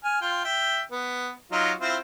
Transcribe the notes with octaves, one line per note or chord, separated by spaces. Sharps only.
G#5 F6
F4 G5
E5 G5
B3
F#3 D#4 F4
C4 E4 F4